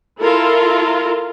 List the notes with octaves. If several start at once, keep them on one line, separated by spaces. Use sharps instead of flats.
E4 F4 A4 A#4